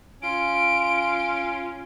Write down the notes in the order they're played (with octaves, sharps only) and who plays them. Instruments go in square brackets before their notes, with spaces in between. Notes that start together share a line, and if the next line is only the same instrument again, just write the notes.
[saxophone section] C#4 F4 [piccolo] D7